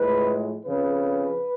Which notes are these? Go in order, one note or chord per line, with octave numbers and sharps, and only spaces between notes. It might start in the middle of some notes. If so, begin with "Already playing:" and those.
Already playing: A2 F3 G#3 B4
F2 C#3 F3 B4